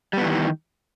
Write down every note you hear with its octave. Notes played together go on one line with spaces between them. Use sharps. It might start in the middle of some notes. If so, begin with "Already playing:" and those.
D#3 E3 G3 B3